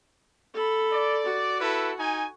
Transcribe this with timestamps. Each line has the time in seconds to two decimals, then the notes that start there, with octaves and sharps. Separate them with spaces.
0.54 A4 B5
0.91 D5
1.26 F#4
1.59 E4 A4 B4
1.99 D#4 G#5